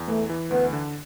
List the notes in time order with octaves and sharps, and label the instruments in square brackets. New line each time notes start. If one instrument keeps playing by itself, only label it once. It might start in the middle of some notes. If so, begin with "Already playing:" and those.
Already playing: [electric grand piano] E2
[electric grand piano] E3 [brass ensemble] A3
[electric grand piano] E3
[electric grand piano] D2 [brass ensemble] B3
[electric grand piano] D3